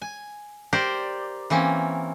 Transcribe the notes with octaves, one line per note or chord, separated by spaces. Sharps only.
G#5
G4 A#4 C5 D5
E3 A#3 C4 C#4